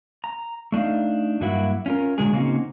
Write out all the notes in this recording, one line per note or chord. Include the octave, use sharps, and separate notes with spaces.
A#5
A3 D4 D#4 F5
G2 F#3 A#3 E4 F#4
C#4 F4 A#4
A#2 D3 F#3 G#3 G#4
C#3 A#3 C4 C#4 D#4 F#4